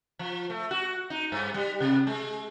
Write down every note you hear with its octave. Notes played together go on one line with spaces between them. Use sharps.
F3
A3
F#4
D#4
G2
G3
C3
G#3